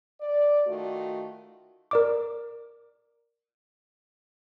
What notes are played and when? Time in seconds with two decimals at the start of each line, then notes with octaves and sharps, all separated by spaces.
0.21 D5
0.66 D#3 A3 F4 F#4
1.91 A#4 D5 D6